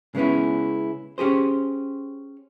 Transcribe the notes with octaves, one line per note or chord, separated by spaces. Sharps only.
C#3 G#3 B3 C#4 E4
C#4 G4 G#4 C5